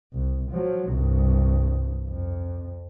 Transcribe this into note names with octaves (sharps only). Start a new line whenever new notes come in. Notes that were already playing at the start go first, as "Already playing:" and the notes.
C2
F3 F#3
C2 G2
F2